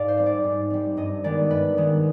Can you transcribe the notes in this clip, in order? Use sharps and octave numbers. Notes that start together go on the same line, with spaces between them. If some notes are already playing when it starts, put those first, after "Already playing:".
Already playing: G#2 D5 F5
C5
G3 C4
D5
G#2
G3 C4
G2 D#5
D#3 G#3 B3 D5
G2 B4
D#3 G#3 B3